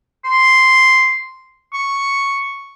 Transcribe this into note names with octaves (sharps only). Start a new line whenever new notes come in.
C6
C#6